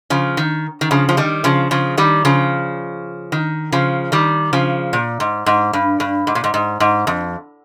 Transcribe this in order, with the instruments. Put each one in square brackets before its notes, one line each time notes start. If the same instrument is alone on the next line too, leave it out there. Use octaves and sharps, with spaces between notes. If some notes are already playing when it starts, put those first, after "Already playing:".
[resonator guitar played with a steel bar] C#3 F3
D#3
D#3
C#3 F3
F3
D#3 G3
C#3 F3
C#3 F3
D#3 G3
C#3 F3
D#3
C#3 F3
D#3 G3
C#3 F3
A#2
G#2
G#2
G2
G2
G#2
A#2
G#2
G#2
G#2
F2